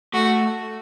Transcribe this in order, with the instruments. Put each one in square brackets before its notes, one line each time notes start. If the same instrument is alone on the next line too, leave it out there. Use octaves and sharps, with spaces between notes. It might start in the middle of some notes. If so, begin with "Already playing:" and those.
[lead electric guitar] A3 [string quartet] F#4